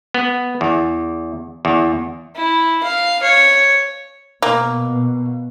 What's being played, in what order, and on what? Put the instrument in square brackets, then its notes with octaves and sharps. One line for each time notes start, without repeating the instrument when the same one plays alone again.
[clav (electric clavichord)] B3
E2
E2
[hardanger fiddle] E4
F5
C#5
[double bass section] B2 [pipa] A#3